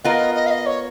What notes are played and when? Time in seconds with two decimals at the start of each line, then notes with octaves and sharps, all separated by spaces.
0.04 B3 F4 A#4 D#5
0.35 D#5
0.46 F5
0.51 D#5
0.66 C#5